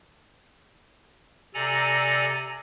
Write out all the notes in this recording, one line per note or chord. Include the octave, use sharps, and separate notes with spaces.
C3 A4 D5 G#5 A#5 A#6